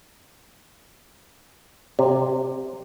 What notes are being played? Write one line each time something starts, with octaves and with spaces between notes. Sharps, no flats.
C3